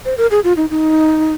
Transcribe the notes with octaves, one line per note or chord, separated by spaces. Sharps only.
C5
A#4
G#4
F4
D#4
D#4